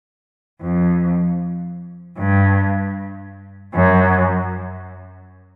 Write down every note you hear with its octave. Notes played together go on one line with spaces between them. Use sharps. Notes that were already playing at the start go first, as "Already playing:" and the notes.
F2
G2
F#2